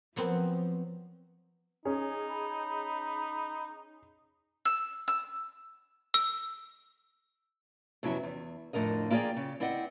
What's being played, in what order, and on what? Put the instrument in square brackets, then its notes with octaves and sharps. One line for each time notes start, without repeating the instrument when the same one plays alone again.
[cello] F3 [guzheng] F#3 B3 C4
[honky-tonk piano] C#4 G#4 [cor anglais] D#4
[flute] B5
[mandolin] E6
E6
[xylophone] E6
[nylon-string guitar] F2 C3 F#3 B3 C#4 E4
E2
F2 A2 D3 A#4 D#5
A#3 E4 F4 G#4 D5 G5
C#3
C4 E4 D5 D#5 F#5